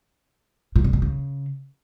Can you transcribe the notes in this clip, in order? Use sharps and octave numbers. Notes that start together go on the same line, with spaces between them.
A#2
C3
B2
C#3